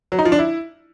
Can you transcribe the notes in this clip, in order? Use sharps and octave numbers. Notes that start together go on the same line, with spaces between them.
F#3
D#4
F3
D4
E4